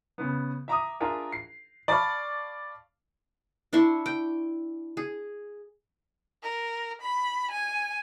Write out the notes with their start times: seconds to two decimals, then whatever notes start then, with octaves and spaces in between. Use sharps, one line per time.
0.18 C#3 B3
0.68 E5 A#5 D6 D#6
1.00 D4 F4 G#4 A#4 E5
1.32 C7
1.88 D5 F5 A5 B5 C#6 F6
3.73 D4 E4 C6 C#6
4.06 G5
4.97 G#4
6.43 A#4
7.02 B5
7.51 G#5